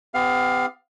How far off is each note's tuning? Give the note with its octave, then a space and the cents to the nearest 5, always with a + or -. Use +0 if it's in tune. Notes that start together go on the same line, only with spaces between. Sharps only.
B3 +40 G4 +20 F5 +15